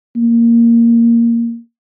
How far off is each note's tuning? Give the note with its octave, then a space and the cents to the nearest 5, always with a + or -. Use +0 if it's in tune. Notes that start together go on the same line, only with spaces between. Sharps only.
A#3 -5